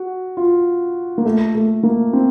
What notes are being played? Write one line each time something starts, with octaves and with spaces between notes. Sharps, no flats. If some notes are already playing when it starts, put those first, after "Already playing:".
Already playing: F#4
F4
A#3
A3
A3
A#3
C4